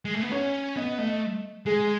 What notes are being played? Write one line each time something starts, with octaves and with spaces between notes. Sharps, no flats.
G#3
A3
B3
C#4 C#5
B3 D#5
A3 D#5
G#3 G#4